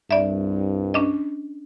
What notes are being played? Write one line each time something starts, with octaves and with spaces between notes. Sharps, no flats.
C2 G2 D5 E5
C#4 D4 D#5